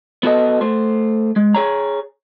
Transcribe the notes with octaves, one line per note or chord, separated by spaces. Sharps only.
B3 F#4 A4 D#5
A3 C5
G#3
G#4 C#5 A#5